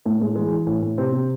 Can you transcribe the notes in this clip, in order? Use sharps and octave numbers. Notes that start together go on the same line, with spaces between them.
A2 A3
A2 G#3
E3 G#3
E3
A2
A2
C3 C4
C3